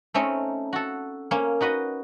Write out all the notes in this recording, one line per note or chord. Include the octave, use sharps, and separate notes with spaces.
A3 C4 C#4 D#4
F#4 A4
A#3 C#4
D#4 F#4 B4 D#5